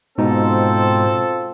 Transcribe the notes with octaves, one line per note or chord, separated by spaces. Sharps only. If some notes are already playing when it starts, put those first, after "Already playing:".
G#2 B2 C4 D#4 F4 A4